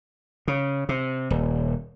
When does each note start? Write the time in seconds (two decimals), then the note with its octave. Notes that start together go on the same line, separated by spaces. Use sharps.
0.48 C#3
0.89 C3
1.30 D#1